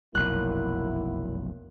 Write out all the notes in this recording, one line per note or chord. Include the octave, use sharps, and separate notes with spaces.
F1 B1 F#2 F#3 A#3 E4 F#6